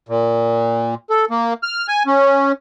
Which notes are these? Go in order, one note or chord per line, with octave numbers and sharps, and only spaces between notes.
A#2
A4
A#3
F6
G#5
C#4